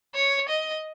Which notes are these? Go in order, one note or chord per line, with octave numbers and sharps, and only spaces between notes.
C#5
D#5